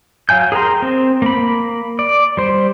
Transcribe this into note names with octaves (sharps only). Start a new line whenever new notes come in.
F#3 F5 G#5 G6
G#4 A#4 G5 A#5 C6
C4
A#3 B5
D5
G3 C5